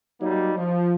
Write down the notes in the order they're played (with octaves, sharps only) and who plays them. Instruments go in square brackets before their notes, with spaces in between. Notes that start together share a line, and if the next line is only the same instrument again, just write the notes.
[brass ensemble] F#3 G3 A#3 D#4
F3